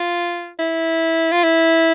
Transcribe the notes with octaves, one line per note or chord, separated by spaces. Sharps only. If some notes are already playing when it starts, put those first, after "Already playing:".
Already playing: F4
E4
F4
E4